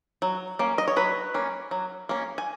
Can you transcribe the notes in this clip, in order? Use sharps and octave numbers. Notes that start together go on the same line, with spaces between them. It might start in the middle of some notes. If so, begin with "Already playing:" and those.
F#3
A#3 C#4
D#5
C#5
F#3 B4
A#3 C#4
F#3
A#3 C#4
G#5